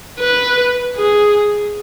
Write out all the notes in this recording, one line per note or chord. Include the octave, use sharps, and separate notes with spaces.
B4
G#4